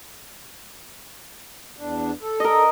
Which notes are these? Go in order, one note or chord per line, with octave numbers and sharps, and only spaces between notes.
E2 D4
A4
A#4 D#5